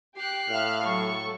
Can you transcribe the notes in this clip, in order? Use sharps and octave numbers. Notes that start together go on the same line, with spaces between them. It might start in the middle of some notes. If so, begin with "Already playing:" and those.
G4 F#6 C7
A2 E5 F5 F6
F#3 A4 C#6